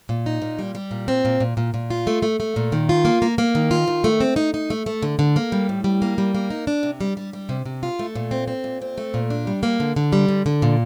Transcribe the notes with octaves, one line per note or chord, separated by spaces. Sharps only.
A#2
D#4
A#2
G3
G3
A#2
C4
A#2
A#2
A#2
A#2
F4
A3
A3
A3
A#2
D#3
F4
A#3
A#3
A#3
D#3
F4
D#3
A3
C4
D#4
D#4
A3
A3
D3
D3
A#3
G3
A2
G3
A#3
G3
A#3
D#4
D4
C3
G3
G3
G3
C3
C3
F4
A3
A#2
C4
C4
A#2
C4
A3
A#2
D4
G3
A#3
D3
D3
G3
D3
D3
A#2